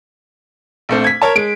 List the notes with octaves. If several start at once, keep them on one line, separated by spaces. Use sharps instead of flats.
A#1 A3 C4
G#6 B6
A#4 C#5 A5
G#3 D7